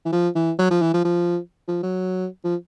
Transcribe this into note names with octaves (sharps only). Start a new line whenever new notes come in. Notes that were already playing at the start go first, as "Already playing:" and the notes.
E3
F3
E3
F#3
F3
E3
F3
F3
F3
F#3
F3